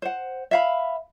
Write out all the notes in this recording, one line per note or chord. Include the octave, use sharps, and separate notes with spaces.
C5 F#5
E5 F5 B5